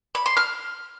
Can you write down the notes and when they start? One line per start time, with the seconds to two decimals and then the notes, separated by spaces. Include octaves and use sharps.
0.15 B5
0.26 C6
0.37 F6